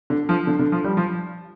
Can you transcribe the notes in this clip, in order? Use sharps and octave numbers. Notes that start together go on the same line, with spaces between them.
D3
F3
D3
D3
F3
G3
F3